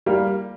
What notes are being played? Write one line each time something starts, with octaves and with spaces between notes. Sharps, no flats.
G3 A#3